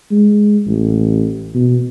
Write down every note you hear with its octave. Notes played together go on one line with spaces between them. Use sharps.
G#3
A1
B2